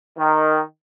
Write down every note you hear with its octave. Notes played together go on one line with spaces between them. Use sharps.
D#3